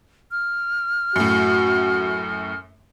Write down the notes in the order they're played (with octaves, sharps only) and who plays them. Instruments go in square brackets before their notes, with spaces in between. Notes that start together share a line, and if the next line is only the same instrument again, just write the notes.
[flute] F6
[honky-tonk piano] F#2 A2 [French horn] F#4